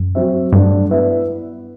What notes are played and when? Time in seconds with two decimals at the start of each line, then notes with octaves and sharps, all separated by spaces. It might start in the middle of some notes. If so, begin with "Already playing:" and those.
Already playing: F#2
0.15 F#3 C4 F#4 C5 E5
0.53 G2 F#3 A3 D4
0.90 B3 E4 B4 E5